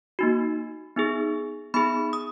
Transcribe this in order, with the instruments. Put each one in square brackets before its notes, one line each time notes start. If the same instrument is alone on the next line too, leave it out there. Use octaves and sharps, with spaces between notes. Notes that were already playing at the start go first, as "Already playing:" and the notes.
[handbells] A#3 D#4 F#4
B3 D#4 G#4
B3 D#4 G#4 B5
D#6